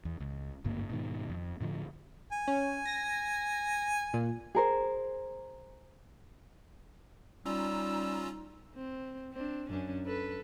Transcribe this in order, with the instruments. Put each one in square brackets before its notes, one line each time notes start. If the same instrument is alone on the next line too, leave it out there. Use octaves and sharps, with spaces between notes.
[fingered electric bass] E2
C#2
G#1 D2 G2 A#3
G#2 B2 D#3
F2
A2 D3 F3
[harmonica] G#5
[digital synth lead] C#4
A#6
A#2
[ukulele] G#4 A#4 C5
[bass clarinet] G3 [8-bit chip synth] C#4 F4 A#5 [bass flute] D#4 [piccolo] E6
[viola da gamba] C4
C4 D4
F#2 C#4 D4
A4 B4